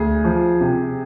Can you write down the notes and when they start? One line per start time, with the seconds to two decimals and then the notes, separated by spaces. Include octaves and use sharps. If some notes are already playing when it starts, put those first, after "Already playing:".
Already playing: D2 G#4
0.24 F3
0.61 C3